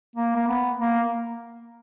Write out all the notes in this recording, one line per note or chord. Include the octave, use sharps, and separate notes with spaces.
A#3
A#3
B3
A#3